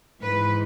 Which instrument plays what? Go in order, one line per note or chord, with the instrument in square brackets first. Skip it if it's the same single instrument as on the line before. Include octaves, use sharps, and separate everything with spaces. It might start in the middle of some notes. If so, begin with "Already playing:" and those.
[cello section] G#2 E3 B4